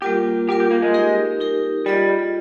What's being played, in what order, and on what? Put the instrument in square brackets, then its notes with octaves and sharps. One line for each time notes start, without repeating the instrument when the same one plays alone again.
[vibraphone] G3 A#3 F4 A#4 [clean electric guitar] G4
[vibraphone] G3 A#3 F4 A#4 [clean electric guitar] G4
[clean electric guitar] G4
A#3
G#3
[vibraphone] D#4 G4 A#4
D#4 G4 A#4
[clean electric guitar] G3 [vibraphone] F4 G#4 D#5